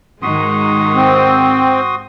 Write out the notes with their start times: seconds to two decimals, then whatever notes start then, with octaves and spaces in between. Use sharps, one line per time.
0.22 G#2 D#3 G#3 F#4 C6 D#6
0.95 C4